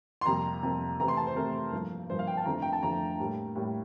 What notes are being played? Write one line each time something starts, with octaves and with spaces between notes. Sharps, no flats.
C6
F2 C3 G3 A#3 A#5
F2 C3 G3 A#3
C3 E3 A3 C4 A#5
C6
A5
C5
C3 E3 A3 C4 A#4
G2 F3 A#3
G2 F3 A#3 C5
F5
G5
A5
F2 D3 F3 A3 C4 A#5
G5
A5
F2 D3 F3 A3 C4 A#5
A2 G3 A#3
A2 G3 A#3